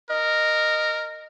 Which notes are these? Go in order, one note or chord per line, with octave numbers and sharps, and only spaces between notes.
A#4 D#5